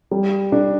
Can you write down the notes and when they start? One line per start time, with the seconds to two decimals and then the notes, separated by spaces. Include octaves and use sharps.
0.11 G3
0.52 D4